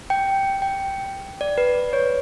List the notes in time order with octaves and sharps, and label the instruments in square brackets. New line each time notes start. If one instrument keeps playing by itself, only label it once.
[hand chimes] G5
G5
D5
B4
C#5